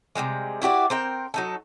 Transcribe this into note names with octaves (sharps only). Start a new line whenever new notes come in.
C3 F3 G3 G#3
E4 F#4 G4 D5
C4 A#4 G5
F#3 D#4 A4